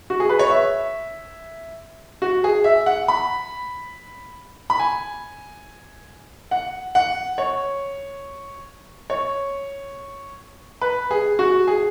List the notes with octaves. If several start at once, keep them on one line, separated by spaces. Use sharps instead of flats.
F#4
G#4
B4
C#5
E5
F#4
G#4
E5
F#5
B5
B5
G#5
F#5
F#5
C#5
C#5
B4
G#4
F#4
G#4